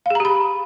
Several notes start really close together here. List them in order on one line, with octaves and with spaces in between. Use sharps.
F5 G#4 A#5 G4 B5